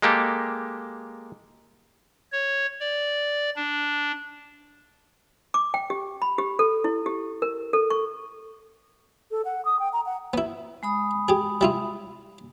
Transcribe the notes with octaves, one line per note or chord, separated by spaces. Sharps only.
G#3 A#3 G4 A4
C#5
D5
D4
D6
G5
G4
B5
G4
A4
E4
G4
A#4
A4
C#6
A4
F#5
D#6
G5
A#5
F#5
B3 E4
G#3 B5 D#6
G4 G#4
G3 E4 F4